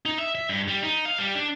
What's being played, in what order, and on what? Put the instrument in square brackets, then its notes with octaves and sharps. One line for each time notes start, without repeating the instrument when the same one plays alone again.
[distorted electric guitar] D#4
E5
E5
G2
G3
D#4
F5
G3
D4